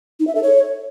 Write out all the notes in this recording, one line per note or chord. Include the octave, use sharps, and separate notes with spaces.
D#4
E5
A4
C#5